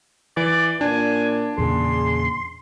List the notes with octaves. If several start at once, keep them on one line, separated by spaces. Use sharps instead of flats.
E3 D5
A#2 D4 G#5
E2 A#2 C#3 G#4 C6